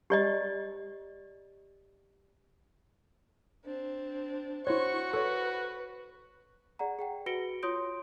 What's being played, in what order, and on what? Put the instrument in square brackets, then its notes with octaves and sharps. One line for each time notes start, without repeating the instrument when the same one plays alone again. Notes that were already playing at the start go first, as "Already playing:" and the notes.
[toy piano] G4 D5 D#5
[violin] C4 D4
[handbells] E4 C#5 [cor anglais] F#4 [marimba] C5 C6 [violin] C#6
[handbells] A4 C#5 [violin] B4 [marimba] C#6
[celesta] G#4 D5 F#5 A#5
G#4 F#5 G5
F#4 B4 A#6 C#7 D7 G7
F4 C#5 C6 D#6 G6 D7